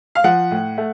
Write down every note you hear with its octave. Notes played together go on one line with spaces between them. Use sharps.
F5
F3 F#5
A2
A3